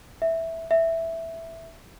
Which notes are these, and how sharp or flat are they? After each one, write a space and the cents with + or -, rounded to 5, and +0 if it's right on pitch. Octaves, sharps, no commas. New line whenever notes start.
E5 -5
E5 +0